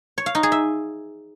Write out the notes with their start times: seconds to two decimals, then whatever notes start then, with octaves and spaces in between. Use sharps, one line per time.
0.18 C#5
0.26 F5
0.35 D#4
0.43 G#4
0.52 E5